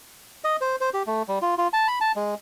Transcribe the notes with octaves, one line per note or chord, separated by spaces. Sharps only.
D#5
C5
C5
G4
A3
G3
F4
F4
A5
B5
A5
G#3